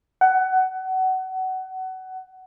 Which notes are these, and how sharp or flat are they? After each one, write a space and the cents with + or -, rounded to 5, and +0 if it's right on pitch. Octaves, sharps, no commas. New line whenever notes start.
F#5 +20